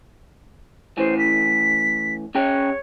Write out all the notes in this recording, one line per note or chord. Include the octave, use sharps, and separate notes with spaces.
A2 E3 C#4 C5
B6
C#4 G#4 C#5 G5